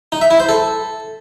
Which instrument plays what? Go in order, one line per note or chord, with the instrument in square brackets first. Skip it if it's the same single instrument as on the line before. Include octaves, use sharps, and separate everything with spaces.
[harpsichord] D#4
E5
E4
C5
A4